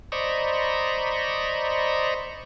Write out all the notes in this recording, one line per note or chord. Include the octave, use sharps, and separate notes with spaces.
C5 D5 D#5 A#5 B5 C#6